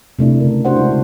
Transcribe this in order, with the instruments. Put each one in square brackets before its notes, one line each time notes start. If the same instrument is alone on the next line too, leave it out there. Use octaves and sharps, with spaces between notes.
[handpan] C3 A3 D4 E4
C#3 A#4
D4 F#4 C5 F#5
G#3 E4
C#3 A3